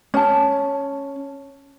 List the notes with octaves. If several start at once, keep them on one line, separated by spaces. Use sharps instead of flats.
C#4 A5